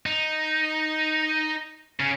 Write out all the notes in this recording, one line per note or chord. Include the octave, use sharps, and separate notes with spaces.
D#4
C#3